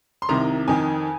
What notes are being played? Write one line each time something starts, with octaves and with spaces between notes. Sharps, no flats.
C6
C2 C3 D#3 A#5
F2 D#3 G#5